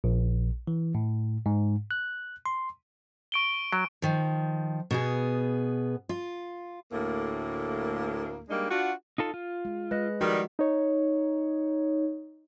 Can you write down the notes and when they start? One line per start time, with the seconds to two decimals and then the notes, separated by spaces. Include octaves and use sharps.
0.04 A#1
0.67 E3
0.95 A2
1.46 G#2
1.91 F#6
2.46 C6
3.32 C#6 D7 G7
3.72 F#3
4.02 D#3 F3
4.91 B2 B3 G#4
6.09 F4
6.92 D2 A2 A#3
8.49 G3 G#3 A#3 D4 D#4
8.71 D4 F4 F#4
9.18 D#4 F4 A4
9.34 F4
9.65 G#3
9.91 G#3 B4 D#5 F#6
10.21 D#3 F3 G3 F#4
10.59 D#4 C#5